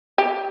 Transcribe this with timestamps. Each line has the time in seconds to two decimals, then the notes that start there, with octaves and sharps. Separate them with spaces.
0.18 G4